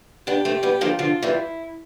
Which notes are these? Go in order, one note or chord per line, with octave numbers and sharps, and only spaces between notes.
B3 D4 G4
A3 C4
G3 B3
D3 F3
D3 F3 F4
E3 G3
E4